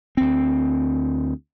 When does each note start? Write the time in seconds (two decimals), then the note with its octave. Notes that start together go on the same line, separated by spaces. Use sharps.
0.17 D2 C4